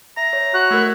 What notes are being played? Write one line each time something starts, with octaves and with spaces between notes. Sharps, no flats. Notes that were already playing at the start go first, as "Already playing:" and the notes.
E5 A#5
C#5
F#4 F#6
A3 E4 A#4